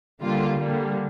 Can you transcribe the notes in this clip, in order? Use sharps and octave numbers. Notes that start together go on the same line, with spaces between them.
D3 G3 A#3 F4
D3 G3 A#3